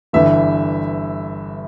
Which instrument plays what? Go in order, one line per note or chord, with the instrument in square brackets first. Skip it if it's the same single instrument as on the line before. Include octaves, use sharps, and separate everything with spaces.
[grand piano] G1 G2 E3 [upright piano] E5